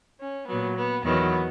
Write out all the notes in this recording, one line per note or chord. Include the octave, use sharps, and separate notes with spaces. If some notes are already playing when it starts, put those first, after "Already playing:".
C#4
A#2 F#3 B3
B3
E2 D#3 F#3 B3